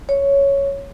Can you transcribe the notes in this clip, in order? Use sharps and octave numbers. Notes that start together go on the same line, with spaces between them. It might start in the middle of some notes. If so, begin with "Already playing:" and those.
C#5